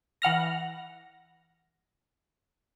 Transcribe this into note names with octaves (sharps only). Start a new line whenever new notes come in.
E3 F#5 F6 A#6